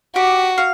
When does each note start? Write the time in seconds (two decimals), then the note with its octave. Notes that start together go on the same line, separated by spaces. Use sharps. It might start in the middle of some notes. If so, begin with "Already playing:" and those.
0.15 F#4 G4
0.58 F5